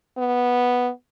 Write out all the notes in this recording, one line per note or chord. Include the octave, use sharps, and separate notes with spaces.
B3